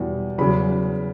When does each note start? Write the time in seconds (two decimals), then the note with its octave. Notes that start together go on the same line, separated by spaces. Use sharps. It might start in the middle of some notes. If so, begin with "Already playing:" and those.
Already playing: E2 B2 G3
0.38 E2 C#3 F#3 B5